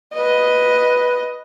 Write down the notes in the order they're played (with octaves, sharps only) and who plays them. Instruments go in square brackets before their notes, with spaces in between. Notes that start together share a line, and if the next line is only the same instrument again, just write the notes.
[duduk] B4 [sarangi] D#5